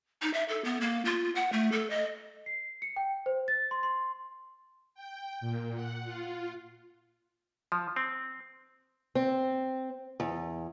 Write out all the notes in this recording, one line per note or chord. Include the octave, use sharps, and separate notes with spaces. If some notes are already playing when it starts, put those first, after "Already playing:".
D#4
E5
A4
B3
A#3
F4
F#5
A3
A4
D#5
C7
C#7
G5
C5
A6
C6
C6
G5
A#2
F#5
F4
F3
C4
C4
E2